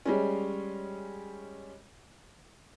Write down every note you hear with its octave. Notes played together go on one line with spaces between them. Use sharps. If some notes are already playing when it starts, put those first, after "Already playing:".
G3 G#3 C#4